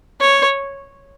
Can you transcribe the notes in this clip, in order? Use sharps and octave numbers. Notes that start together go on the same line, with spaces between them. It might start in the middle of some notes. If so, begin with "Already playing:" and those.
C#5